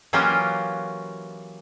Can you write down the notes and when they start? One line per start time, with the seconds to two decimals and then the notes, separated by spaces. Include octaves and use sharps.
0.13 E3 F#3 A#3 C#4 F4 G4